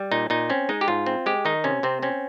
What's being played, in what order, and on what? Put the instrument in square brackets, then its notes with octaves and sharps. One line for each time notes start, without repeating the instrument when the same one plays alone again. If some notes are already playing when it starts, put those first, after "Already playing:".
Already playing: [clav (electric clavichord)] G3
A#2 D#4
A#2 D#4
C4 C#4
G#3 D#4
G4
G#2 F4
C4
G#3 G4
D#3 D#4
C3 C#4
C3 C4
C4 C#4